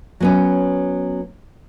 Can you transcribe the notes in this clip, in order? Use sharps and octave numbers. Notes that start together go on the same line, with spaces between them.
F#3 B3 C#4